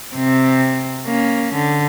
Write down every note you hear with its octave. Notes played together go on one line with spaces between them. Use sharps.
C3 C4
A#3 C#4
D3